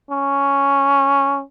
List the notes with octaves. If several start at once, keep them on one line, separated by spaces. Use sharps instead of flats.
C#4